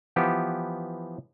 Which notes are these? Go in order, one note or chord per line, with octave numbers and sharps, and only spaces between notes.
E3 F3 B3 G4